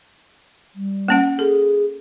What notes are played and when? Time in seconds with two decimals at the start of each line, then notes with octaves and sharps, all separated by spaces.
0.75 G3
1.08 A#3 C#4 F#5
1.39 G#4 A4